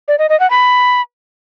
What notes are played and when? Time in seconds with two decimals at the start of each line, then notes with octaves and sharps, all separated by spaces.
0.08 D5
0.19 D#5
0.29 D#5
0.40 F#5
0.50 B5